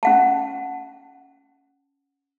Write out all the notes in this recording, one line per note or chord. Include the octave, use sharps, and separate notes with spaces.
C#4 F#5 A5